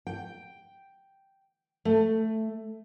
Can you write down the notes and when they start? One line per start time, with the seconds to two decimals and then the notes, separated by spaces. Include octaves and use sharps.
0.07 G5
1.85 A3